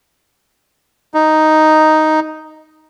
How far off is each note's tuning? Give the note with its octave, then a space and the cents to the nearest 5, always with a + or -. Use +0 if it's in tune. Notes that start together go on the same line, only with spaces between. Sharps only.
D#4 +0